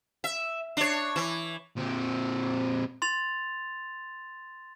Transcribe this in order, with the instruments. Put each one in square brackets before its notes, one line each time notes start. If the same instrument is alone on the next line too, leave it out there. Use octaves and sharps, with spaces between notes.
[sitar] E5
D4 C#5
E3
[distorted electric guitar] A#2 C4
[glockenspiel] C6 A6 F7